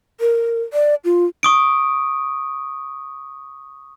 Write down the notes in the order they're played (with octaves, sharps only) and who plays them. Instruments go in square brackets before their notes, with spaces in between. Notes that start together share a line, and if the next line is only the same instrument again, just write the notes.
[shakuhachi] A#4
D5
F4
[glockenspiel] C#6 D#6 D7